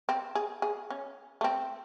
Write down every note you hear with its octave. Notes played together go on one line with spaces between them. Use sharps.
C4
G#4
G#4
C#4
A3
C4